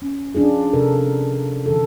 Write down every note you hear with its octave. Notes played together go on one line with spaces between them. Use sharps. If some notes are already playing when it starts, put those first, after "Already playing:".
C#4
F3 C#4 D4 F4 G#4
C3 A4 A#4
D3 E3 A4